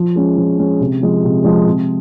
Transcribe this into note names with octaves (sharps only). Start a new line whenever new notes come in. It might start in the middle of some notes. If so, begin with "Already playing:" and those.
Already playing: F3
G#3 C#4 G#4
F3
G#3 C#4 G#4
C3
F3 G#3
C3
F3 G#3
C3